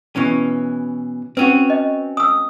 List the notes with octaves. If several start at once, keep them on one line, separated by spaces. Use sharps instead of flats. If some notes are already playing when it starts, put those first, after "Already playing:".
B2 E3 C#4
C4 C#4 F#4 B4
D#5
D#6 E6